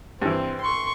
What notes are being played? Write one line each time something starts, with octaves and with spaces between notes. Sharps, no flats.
G2 E3 C4
C6 C#6